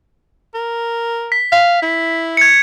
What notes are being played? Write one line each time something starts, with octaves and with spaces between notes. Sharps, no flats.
A#4
B6
F5 B6
E4
G#6 C#7